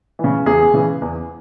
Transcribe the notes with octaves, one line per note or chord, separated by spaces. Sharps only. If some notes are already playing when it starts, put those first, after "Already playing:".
C#3 E3
E2 G#4
C#3 E3
E2